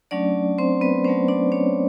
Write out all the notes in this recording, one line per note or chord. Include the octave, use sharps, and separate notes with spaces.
F#3 A3 C#4 D4 D5
C4 C5
B3 B4
F#3 A3 C4 C#4 C5
D4 D5
C#4 C#5